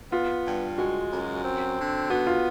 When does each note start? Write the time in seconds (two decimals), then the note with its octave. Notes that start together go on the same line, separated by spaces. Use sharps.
0.12 B3 F4
0.45 G2
0.78 G#3 F#4
1.11 F#2
1.44 C4
1.77 D3
2.10 B3 F#4
2.27 F4